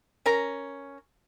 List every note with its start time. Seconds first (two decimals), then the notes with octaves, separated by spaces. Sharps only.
0.26 C#4 A#4 A#5